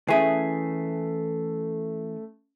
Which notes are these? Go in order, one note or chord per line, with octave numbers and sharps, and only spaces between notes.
E3 A3 C#4 G#4 E5 G#5 B6 C7